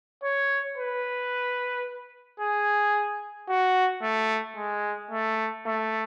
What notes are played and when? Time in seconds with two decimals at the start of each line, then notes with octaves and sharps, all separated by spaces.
0.23 C#5
0.78 B4
2.40 G#4
3.49 F#4
4.02 A3
4.56 G#3
5.11 A3
5.66 A3